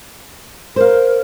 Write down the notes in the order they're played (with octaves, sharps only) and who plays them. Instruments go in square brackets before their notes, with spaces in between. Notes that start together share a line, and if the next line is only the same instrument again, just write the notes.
[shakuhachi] A#4 [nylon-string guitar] C5 F5